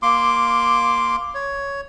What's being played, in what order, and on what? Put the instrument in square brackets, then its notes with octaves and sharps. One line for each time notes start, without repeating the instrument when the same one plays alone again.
[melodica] A#3 C6 D6
C#5